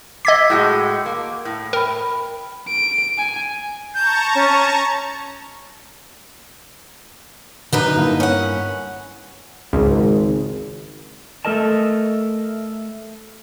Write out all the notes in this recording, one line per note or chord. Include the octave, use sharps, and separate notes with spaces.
D#5 D6 E6 G#6 B6
A2 G#3 F#4
A#3
A2
A#4 G5 B5
D7
G#5
A5 A#5 C#6 G6
C#4
F#2 D3 D#4 B4
G2 A#3 E4
C#4 F#5
G#1 C#2
A3 A4 A#4 D#5 A5